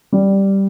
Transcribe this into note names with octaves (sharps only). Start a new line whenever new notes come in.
G3